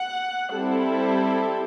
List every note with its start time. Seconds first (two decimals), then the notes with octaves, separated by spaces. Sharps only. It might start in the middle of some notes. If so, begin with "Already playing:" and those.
Already playing: F#5
0.52 G3 C4 E4 A4